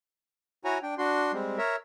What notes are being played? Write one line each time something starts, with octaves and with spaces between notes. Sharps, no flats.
E4 F#4 C#5 G#5 A#5
D4 G5
D4 F#4 C6
G3 G#3 C4
A#4 C#5 E5